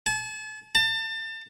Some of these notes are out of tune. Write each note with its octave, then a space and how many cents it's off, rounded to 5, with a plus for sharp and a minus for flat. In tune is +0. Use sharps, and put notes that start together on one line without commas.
A5 -40
A5 +30